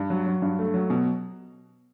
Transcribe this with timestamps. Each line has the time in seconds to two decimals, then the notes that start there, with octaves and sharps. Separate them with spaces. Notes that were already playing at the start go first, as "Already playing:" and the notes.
Already playing: G2
0.10 F#3
0.26 F#3
0.42 G2
0.59 A3
0.74 F#3
0.90 B2